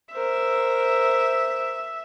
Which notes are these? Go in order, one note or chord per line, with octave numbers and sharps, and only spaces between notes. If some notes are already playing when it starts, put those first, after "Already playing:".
A#4 C5 E5